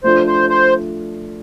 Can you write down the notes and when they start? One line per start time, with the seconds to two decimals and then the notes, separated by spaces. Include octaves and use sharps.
0.04 F3 A3 D4 F4 C5
0.27 C5
0.50 C5